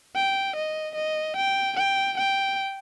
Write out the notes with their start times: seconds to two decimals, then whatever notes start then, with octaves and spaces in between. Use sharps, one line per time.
0.15 G5
0.56 D#5
0.95 D#5
1.36 G5
1.77 G5
2.17 G5